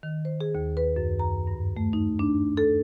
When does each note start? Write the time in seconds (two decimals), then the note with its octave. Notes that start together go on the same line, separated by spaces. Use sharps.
0.03 D#3
0.25 C5
0.41 G#4
0.55 D#2
0.77 B4
0.96 F#2
1.19 A#5
1.47 G2
1.77 A3
1.93 D#4
2.19 D4
2.57 A4